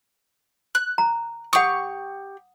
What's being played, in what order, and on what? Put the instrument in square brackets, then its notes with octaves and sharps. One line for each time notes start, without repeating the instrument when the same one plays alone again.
[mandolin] F#6
[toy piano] A#5
[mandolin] G4 C#6 [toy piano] F#5 D#6